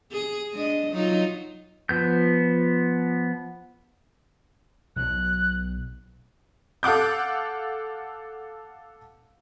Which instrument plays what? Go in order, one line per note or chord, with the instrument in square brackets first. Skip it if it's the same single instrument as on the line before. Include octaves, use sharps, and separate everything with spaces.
[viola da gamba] G#4
G#3 D4 D#5
F#3 D#4 F4
[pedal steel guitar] F3 B3 G6
[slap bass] B1 F#3 [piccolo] F#6
[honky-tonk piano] A4 F5 F#5 D6 G6